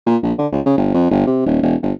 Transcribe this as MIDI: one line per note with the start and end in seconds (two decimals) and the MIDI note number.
0.06 0.17 46
0.23 0.32 34
0.38 0.47 50
0.52 0.60 37
0.66 0.73 49
0.77 0.90 31
0.94 1.06 41
1.10 1.25 31
1.27 1.44 48
1.46 1.60 27
1.62 1.75 28
1.82 1.92 31